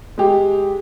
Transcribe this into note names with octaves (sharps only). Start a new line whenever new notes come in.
G#3 G4